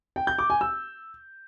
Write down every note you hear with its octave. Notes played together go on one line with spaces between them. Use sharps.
G5
G6
D6
G#5
E6